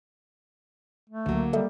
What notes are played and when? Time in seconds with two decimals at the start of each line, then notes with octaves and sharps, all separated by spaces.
1.10 A3
1.26 C#2 D3 F#3 A#3
1.53 G3 A4 D#5 E5